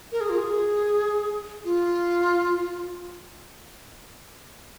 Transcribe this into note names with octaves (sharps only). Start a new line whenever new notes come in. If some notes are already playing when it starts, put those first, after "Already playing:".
A#4
G#4
F4
G#4
F4